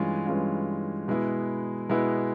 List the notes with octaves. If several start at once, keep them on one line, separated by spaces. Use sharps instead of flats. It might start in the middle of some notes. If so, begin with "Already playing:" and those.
Already playing: G2 E3 G#3 C#4 F4
G2 E3 G#3 C#4 F4
B2 G#3 B3 E4
B2 G#3 B3 E4